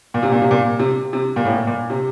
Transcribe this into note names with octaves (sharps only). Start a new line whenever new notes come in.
A#2
C3
A#2
C3
A#2
C3
C3
A#2
A2
A#2
C3